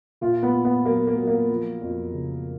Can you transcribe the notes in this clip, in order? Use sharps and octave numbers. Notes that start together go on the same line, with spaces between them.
A#2 F4
B3
A#2
B3
F#3 A#3
A#3
F#3
A#3
F3
F2
C#3